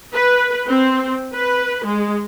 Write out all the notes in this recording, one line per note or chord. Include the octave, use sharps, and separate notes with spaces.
B4
C4
B4
G#3